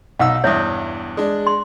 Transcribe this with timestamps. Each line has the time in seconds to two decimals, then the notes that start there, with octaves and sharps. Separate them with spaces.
0.19 B1 D#4 F5 F#5 E6
0.44 E2 G2 C#5 E5 D#6
1.17 G#3 D4
1.47 C6